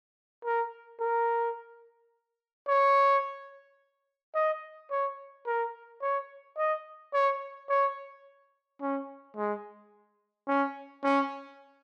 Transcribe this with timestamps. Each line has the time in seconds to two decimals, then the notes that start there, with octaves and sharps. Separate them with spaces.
0.45 A#4
1.00 A#4
2.68 C#5
4.35 D#5
4.91 C#5
5.47 A#4
6.02 C#5
6.58 D#5
7.13 C#5
7.69 C#5
8.81 C#4
9.37 G#3
10.48 C#4
11.04 C#4